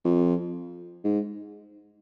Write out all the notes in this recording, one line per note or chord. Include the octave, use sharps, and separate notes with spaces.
F2
G#2